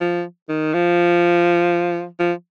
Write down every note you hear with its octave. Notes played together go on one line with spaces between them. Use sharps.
F3
D#3
F3
F3